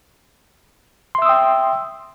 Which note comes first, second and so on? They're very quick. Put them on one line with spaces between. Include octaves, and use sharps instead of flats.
C6 E5 E6 D#6 G5